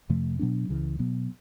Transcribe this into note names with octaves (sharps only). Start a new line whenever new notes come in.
F2 C3 F3 A3
B2 F#3 B3 D4
C#2 C#3 E3
B2 F#3 B3